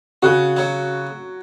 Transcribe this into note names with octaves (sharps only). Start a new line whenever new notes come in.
C#3 F#4
F#3